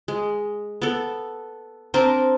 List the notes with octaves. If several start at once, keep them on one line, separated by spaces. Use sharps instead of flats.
G#3
B3 A4
C4 D4 A#4 C5